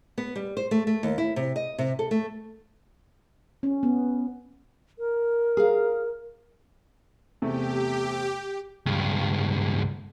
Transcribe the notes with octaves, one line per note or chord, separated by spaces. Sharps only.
B3
G3
C5
A3
A3
D#2
E4
C3
D#5
C3
A4
A3
C#4
B3
A#4
G#4 F5
E2 C3 A3 G4
C#2 G2